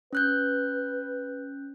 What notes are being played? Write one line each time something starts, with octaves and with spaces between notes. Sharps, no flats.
C#4 B4 F#6 G6